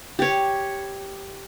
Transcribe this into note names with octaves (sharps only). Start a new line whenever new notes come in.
G4 C#5